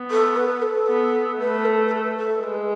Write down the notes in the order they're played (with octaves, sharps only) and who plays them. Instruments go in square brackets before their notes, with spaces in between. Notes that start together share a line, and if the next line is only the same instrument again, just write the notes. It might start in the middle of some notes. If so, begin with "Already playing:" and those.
Already playing: [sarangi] B3
[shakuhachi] A4
B4
A4
[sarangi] B3
[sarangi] A3 [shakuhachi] B4
[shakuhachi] A4
A4
B4
A4
[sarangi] G#3 [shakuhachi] B4